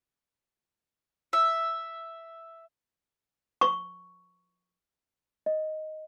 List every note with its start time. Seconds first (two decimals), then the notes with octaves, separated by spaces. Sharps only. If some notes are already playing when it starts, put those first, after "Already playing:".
1.33 E5
3.61 C#6
5.46 D#5